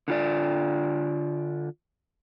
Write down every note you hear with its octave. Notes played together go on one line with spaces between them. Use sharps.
D3 F4 D5